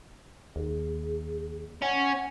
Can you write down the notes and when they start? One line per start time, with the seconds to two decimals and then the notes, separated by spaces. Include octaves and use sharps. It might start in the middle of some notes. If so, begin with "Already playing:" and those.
0.56 D#2 G#4
1.82 C#4 F#5